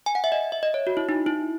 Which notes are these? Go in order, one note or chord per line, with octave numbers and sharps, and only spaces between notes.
G#5
F#5
E5
D#5
E5
D#5
C#5
F#4
E4
D#4
E4